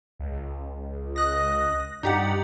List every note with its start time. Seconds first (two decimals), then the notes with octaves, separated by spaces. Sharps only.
0.19 C#2
1.16 D#5 F#6 A#6
2.03 G2 D#4 G4 D5 F#5